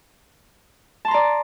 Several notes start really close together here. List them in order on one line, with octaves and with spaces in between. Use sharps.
A5 C6 A#5 D5